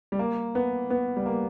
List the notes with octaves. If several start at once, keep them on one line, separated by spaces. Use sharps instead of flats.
G3
A#3
B3
B3
G3
A#3